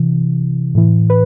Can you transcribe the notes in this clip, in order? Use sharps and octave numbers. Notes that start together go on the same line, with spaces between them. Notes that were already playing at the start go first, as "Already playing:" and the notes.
Already playing: C3 E3
A2 E3
B4